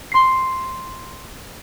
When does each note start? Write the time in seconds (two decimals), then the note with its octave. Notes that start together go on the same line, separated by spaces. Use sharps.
0.12 C6 C7